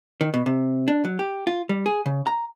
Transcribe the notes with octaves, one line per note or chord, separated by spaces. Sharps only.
D#3
B2
C3
D4
F#3
G4
F4
G3
G#4
C#3
A#5